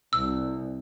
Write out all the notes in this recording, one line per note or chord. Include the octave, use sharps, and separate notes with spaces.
C2 E6